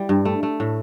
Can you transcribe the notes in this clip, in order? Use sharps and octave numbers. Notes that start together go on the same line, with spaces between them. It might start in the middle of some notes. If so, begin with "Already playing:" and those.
Already playing: G3 E4
G2
A3
A3
A2